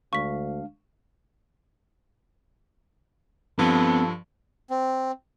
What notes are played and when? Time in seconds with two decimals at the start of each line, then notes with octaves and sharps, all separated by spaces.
0.13 D2 G#3 D4 F5 C#6 B6
3.59 G2 F3 B3 C4 A4
4.70 C4